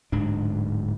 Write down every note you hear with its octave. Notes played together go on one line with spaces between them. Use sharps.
D1 G#2 D4